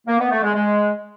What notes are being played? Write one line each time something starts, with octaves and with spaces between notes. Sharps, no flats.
A#3
B3
A3
G#3
G#3